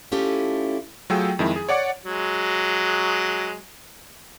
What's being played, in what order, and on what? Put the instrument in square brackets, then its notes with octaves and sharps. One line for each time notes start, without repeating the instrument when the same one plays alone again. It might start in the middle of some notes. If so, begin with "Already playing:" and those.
[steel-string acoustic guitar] A3 C#4 E4 F4 G4 A4
[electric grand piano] F#3 A3 F4 G#4 G5 E6
F2 D#3 G#3 E4
G#4
C#5 D5 F#5 D6 C#7
[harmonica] F#3 G#3